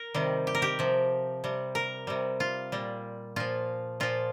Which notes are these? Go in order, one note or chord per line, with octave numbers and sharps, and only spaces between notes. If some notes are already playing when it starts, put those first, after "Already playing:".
Already playing: A#4
C3 D#3 G3
G4
A#4
G4
C3 F3
C3 G3
A#4
C3 G3
F4
A#2 G3
A#2 F3 F4
A#2 F3 F4